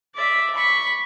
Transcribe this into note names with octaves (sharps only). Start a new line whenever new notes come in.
D5 E5
B5 C#6